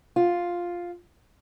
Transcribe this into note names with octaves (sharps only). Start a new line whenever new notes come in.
F4